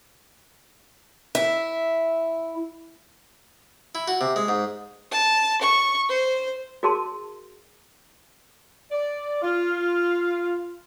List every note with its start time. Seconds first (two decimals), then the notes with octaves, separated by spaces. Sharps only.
1.35 E4 E5
3.95 E4
4.08 F#4
4.21 C3
4.36 G#3
4.48 G#2
5.11 A5
5.61 C#6
6.09 C5
6.83 F#4 G#4 A#4 A5 C6
8.91 D5
9.42 F4